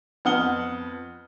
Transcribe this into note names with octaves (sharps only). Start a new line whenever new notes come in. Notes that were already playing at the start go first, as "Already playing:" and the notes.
F2 B3 F#5 D#6 F6 G7